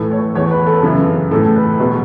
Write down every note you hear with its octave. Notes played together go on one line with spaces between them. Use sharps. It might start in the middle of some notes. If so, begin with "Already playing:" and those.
Already playing: A2 E3 A4
C#5
E2 E3 C#5
B4
A4
F#2 C#3 E3
A2 E3 A4
B4
E2 B2 F#3